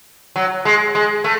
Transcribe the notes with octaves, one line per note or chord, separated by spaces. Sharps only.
F#3
G#3
G#3
A3